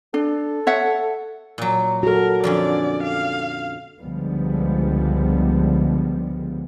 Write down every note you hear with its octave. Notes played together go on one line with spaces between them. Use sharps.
D4 A4
C#5 E5 F#5
A#2 F#3
F#4 A4 A#4
F2 D3 C#4 D5
F5
C#2 D3 F3 G3 G#3 B3